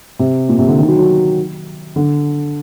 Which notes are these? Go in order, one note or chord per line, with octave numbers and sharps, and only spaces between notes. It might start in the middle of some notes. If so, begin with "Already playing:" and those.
C3
A#2
C3
D3
D#3
F#3
F#3
D3